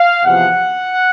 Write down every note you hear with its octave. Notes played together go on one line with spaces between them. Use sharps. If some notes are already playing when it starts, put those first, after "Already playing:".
Already playing: F5
E2 C3 F3 F#5